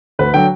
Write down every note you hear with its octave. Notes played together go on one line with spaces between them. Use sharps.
D2 B4
D3 F#3 G5